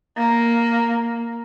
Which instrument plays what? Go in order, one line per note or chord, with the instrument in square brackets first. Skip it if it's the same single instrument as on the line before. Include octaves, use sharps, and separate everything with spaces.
[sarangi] A#3